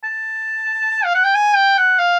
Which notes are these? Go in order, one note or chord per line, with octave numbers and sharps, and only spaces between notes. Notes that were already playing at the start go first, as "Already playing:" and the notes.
A5
F5
F#5
G5
G#5
G5
F#5
F5